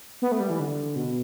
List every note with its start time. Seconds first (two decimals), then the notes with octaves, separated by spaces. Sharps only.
0.22 B3
0.32 A3
0.40 G3
0.50 E3
0.60 D3
0.96 B2